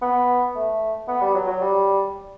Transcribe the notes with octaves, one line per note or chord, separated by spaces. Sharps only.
B3
A3
B3
G3
F#3
F#3
G3